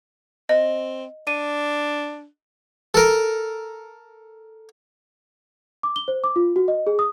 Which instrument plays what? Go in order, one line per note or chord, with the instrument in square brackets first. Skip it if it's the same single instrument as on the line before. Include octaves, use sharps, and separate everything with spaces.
[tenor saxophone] C4 [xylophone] D#5
[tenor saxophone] D4 [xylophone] D#7
[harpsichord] A4 A#4
[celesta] D6
G7
C5
D6
F4
F#4
D#5
G#4
D#6